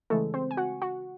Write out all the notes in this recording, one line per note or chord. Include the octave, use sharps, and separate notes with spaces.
C#3 E3 G#3 A3 A4
C4 C5
G#5
F#4 F#5
F#4 F#5